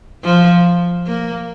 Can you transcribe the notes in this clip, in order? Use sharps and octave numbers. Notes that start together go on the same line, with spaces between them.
F3
A#3